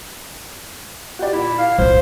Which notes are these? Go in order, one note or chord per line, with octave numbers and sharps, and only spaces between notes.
F#4 G4 D5
A#2 E4
F5
D1 C4 C5